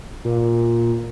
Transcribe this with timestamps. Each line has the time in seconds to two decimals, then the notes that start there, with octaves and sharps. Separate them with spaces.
0.25 A#2